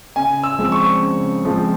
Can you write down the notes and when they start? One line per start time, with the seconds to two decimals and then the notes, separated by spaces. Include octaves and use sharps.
0.16 C#3 G#5
0.44 E6
0.59 F3 G#3 C4
0.64 E6
0.72 C#6
1.02 C#3
1.45 F3 G#3 C4